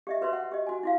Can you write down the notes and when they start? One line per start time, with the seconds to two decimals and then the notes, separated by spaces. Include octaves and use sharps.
0.07 G4 D#5 E5
0.21 F#4 B4 C5 E5 C6
0.33 F#5
0.52 G4 D#5
0.67 F#4 G#5
0.83 E4 F#4 F5